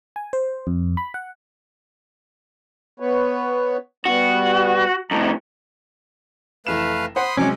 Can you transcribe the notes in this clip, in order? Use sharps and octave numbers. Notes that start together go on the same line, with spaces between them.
G#5
C5
F2
B5
F#5
B3 B4 C#5
G3 B3 F#4
F2 A2 C3 A#5
F1 E3 A3 B4 F5 E7
C5 F#5 B5 C6 D#6
C3 F#3 G#3 C#4 D6